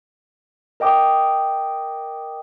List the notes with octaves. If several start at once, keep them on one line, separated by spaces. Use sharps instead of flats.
A#4 D#5 G5 D6 D#6